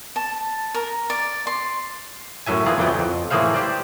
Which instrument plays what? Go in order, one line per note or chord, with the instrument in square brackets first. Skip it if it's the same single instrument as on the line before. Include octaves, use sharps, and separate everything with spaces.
[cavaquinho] A5
A#4
D5
C6
[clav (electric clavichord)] F#2 A2 F#3 E5 G#5
E3 A#3 F4 G#4
F2 E3 F#3 B3 G5
F2
A2 E3 A#3 G#4 C5 F5
G4 C5 D5